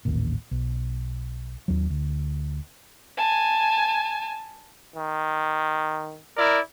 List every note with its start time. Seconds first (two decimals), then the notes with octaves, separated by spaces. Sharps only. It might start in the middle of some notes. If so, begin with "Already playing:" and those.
0.05 A1 D#2 A#2
0.51 B1
1.68 D#2 F#3
1.90 D2
3.17 G#5 A5
4.96 D#3
6.36 E4 A#4 D5